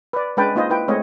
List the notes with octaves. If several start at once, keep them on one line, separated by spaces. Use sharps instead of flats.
B4 D5
G#3 C#4 D4 B4 G5 A5
A#3 D#4 F4 C5 D#5
E4 B4 G5
G#3 A3 C4 C#5 D#5